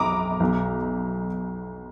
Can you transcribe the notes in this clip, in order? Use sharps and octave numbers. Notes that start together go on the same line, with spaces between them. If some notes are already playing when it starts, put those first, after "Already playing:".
Already playing: B1 B2 A#5 B5 D6 D#6
B1 B2